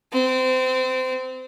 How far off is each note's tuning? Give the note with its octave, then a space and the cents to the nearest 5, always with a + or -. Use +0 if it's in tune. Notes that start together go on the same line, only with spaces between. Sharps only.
C4 -25